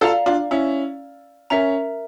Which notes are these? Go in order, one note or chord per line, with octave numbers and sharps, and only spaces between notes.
F4 A4 D5 F5 A#5
D4 F4
C#4 E4
C#4 A#4 E5 A#5